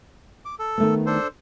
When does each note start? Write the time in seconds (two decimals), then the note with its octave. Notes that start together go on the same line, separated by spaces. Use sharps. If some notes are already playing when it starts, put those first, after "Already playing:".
0.45 D6
0.59 A4
0.78 D#3 A3 B3
1.06 D4 A4 C5